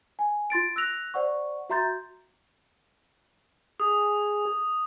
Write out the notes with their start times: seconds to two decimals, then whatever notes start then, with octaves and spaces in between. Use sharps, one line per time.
0.19 G#5
0.50 F4 C6 A6 D7
0.76 E6 F#6 A#6 F7
1.14 C5 D5 F#5 C#6
1.70 F#4 E5 A#5 C6 G6 A6
3.80 G#4 D#6